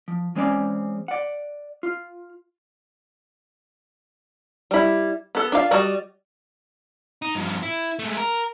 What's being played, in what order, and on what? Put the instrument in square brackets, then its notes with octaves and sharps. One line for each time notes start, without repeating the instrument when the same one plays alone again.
[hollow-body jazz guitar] F3
E3 G#3 C4 C#4 D5
D5 F#5
F4
[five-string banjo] G3 E4
B3 A4
D4 F4 F5
G3 F#4 D5 D#5
[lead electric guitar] D#4
G2 F3
E4
G#3 A3
A#4